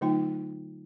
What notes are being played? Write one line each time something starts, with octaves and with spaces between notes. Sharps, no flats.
D3 F#3 A3 D#4 F4 G5